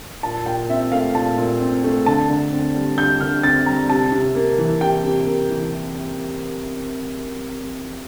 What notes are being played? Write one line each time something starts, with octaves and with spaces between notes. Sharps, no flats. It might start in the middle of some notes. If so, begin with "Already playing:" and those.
A#2 A5
A#2 G5
C4 E5
A3 F5
A#2 A5
A#2
C4
A3
D3 A5
D3
C4
G3
D3 G6
D3 F6
C4 A6
G3 A#5
C3 A5
C3
A#3
E3
C3 G5
C3
A#3
E3